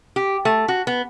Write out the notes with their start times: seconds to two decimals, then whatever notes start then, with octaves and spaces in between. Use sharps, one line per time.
0.16 G4
0.45 A3
0.68 F#4
0.87 B3